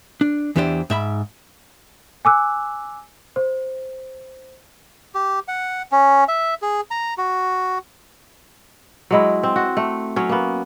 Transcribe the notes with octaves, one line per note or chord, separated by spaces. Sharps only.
D4
E2 E3 D4 G4 C5 D5
G#2 E5 B5
G#5 D6 E6 F#6
C5
G4
F#5
C#4
E5
G#4
A#5
F#4
F#3 G#3 E4
C4
F#4
A3
F#3 C#4
A#3 B3